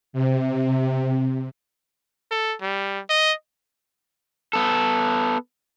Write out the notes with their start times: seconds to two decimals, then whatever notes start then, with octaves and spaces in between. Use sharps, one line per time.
0.13 C3
2.31 A4
2.61 G3
3.09 D#5
4.53 B3 A4